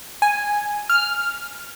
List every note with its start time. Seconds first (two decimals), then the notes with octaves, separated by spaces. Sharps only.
0.22 G#5
0.90 F6